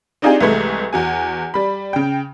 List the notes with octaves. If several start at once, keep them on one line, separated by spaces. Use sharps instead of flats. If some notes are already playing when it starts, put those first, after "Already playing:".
C4 D4 D#4 F4 G4 G#4
C2 E3 G#3 A3
E2 F#4 G#5
G3 B5
C#3 G5